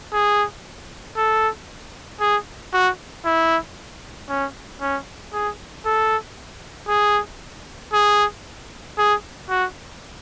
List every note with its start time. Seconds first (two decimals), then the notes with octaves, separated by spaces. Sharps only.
0.13 G#4
1.17 A4
2.21 G#4
2.73 F#4
3.25 E4
4.30 C#4
4.81 C#4
5.33 G#4
5.86 A4
6.89 G#4
7.93 G#4
8.98 G#4
9.50 F#4